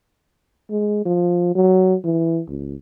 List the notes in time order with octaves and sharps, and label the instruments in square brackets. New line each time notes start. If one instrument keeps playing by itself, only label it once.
[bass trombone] G#3
F3
F#3
E3
C#2